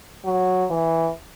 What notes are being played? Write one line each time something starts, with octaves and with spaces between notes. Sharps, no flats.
F#3
E3